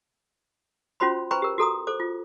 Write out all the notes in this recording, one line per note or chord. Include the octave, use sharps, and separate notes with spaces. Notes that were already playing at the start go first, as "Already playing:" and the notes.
C#4 F4 F#4 C5 B5 C6
B4 C5 G5 A#5 B5 C#6
G4 A#4
F#4 A4 A#5 D#6
A4 C5 D6
F4